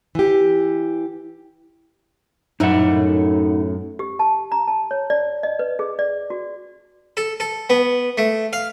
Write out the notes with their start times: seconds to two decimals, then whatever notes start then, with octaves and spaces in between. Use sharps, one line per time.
0.15 E3 G4
2.60 F#2 A2 D#4 E4 F#5
3.99 G4
4.19 A5
4.52 A#5
4.68 A5
4.91 C#5
5.10 D5
5.43 D#5
5.59 B4
5.79 G#4
5.99 D5
6.30 F#4
7.17 A4
7.40 A4
7.70 B3
8.18 A3
8.53 F5